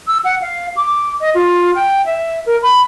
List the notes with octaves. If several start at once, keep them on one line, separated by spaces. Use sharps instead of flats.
E6
F#5
F5
D6
D#5
F4
G5
E5
A#4
B5